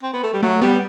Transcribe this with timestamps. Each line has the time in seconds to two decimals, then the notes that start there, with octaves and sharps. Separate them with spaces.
0.03 C4
0.13 B3
0.23 A3
0.33 G3
0.43 F#3 A3
0.61 G3 B3